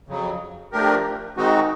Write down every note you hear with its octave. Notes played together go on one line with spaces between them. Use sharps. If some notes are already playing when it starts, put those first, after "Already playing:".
F2 C#3 F#3
F3 A3 D4 G4 A#4
D#3 G#3 C4 D#4 F#4